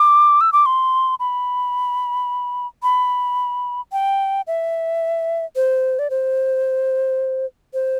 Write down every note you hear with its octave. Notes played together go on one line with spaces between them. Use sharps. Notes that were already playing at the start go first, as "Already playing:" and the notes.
Already playing: D6
E6
D6
C6
B5
B5
G5
E5
C5
D5
C5
C5